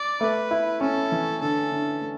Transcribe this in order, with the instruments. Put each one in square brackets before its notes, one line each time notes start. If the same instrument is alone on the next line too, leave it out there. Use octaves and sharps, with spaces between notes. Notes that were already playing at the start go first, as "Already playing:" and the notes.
Already playing: [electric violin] D5
[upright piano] A3 [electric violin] B4
[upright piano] E4
[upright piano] C#4 [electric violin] A4
[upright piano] E3
[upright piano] D3 [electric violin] A4
[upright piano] D3
A3